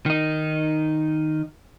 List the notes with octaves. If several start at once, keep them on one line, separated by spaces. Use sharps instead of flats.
D#3 D#4